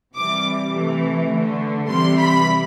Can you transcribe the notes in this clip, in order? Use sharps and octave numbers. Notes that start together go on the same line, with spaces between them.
C3 E3 G3 D6
C3 E3 A3
D3 A3
C3 E3 G3 C6
B5